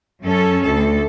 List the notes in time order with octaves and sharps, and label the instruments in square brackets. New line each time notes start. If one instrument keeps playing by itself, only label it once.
[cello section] F#2 C#4 A4
D2 A4